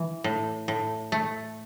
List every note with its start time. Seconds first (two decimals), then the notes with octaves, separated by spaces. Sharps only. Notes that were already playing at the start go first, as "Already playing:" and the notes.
Already playing: E3
0.24 A2
0.68 A2
1.12 A3